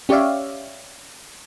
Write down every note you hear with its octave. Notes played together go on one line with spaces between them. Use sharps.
C#4 G4 C#5 D5 E5 F5